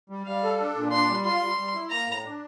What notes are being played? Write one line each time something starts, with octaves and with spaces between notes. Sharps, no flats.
G3
G3 F5
A4
D4
A#2
D4 C6
G3
F4 C6
G3
G3
E4
A#3 A#5
A2
D4